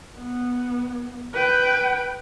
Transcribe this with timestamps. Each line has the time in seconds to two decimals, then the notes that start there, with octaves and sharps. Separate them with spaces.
0.16 B3
1.34 B4 G5